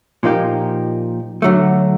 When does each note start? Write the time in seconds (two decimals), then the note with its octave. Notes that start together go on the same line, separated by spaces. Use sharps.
0.23 A#2 F3 A#3 D#4 G4
1.42 D3 F#3 A3